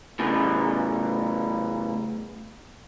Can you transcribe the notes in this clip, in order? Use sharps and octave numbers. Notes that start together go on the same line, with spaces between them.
A2 C#3 A3